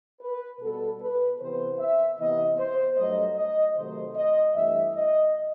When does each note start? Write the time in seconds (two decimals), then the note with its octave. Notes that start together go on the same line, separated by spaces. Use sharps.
0.22 B4
0.61 B2 G3 B3 A4
1.01 B4
1.40 C3 E3 B3 C5
1.79 E5
2.18 C3 E3 B3 D#5
2.58 C5
2.97 G2 F#3 A3 D#5
3.36 D#5
3.76 C3 D#3 F#3 A3 C5
4.15 D#5
4.54 G2 E3 A3 E5
4.94 D#5